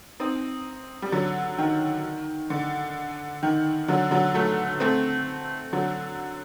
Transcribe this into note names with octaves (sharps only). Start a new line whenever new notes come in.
C4 D#4
G3
D3 F#3
D#3
D3
D#3
D3 F#3
D3 F#3
F#3 A3
A3 C4
D3 F#3